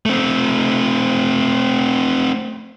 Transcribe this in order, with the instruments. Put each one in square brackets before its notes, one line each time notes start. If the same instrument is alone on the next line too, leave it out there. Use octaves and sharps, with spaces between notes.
[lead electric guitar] A3 C4